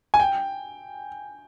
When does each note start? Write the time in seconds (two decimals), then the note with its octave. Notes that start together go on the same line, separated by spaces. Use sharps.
0.14 G#5
0.20 G5